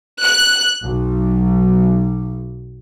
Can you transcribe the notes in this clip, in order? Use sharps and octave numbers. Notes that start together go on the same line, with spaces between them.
F#6
B1